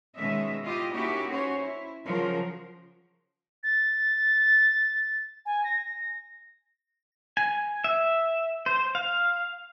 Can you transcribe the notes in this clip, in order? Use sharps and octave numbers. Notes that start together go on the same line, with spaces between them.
B2 D#3 G#3 C#4 D#5 E5
E4 F4 G4 D#5
A#3 C#4 D#4 E4 F#4 G4
C#4 F#4 C5 C#5
E4
C#3 F3 F#3 A#4
A6
G#5
A#6
G#5
E5
C5
F5